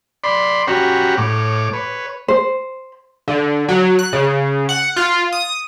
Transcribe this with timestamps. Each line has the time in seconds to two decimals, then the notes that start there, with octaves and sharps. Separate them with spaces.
0.24 D5 B5 C6
0.67 C#4 F#4 G4 A#5 B5 C#6
1.18 A2 C#5 D6
1.73 B4 C#5
2.28 C5
3.28 D3
3.69 F#3
3.99 F#6
4.13 C#3
4.69 F#5
4.96 F4
5.32 D#6